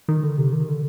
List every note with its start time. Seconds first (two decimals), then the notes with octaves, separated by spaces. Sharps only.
0.08 D#3
0.23 D3
0.38 C3
0.53 D#3
0.68 D3